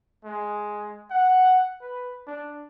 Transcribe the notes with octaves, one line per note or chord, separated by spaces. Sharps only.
G#3
F#5
B4
D4